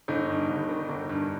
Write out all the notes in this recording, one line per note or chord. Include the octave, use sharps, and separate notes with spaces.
G1 D#4
G2
G1
D#3
G1
G2